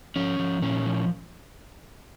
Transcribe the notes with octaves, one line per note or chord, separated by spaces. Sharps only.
F3 C#4
F3
A#2 C#4
F3